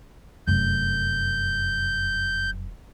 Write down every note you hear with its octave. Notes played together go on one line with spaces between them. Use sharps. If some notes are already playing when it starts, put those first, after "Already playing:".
F1 F#2 G6